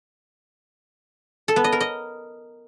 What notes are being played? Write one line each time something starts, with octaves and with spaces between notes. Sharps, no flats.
A4
B3
D#5
A#4
D#5